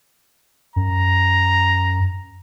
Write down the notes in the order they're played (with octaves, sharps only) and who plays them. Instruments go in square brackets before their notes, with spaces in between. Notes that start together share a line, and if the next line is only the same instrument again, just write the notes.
[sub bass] F#2 [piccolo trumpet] A#5